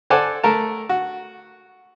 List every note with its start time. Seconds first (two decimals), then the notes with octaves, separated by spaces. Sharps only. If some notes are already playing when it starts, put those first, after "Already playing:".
0.10 A4 C5 D5 F#5 G#5 A5
0.43 A3 A#4 A5
0.89 F#4